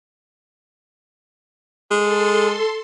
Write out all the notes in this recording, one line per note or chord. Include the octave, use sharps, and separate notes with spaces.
G#3 A4 C6